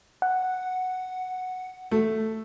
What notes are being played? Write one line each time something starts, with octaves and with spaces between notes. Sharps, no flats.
F#5
A3